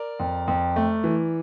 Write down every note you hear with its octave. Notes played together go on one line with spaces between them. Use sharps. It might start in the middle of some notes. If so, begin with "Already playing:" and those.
Already playing: A#4 D5
F2
F2
A3
E3